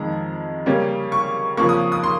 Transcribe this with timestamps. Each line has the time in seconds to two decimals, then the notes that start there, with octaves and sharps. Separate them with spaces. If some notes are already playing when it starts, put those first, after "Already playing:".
Already playing: F2 D#3 G#3 A#5
0.66 C#3 G3 A#3 C#4
1.12 C#6
1.57 C#3 F3 A#3 C#6
1.69 D#6
1.92 D#6
2.04 C6